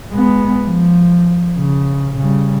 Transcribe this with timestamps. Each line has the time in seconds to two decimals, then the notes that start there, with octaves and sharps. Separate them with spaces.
0.11 G#3 B3
0.66 F3
1.59 C#3
2.18 C#3 G3